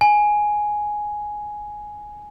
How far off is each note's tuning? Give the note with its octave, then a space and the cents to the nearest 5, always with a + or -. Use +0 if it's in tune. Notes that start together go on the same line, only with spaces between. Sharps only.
G#5 +5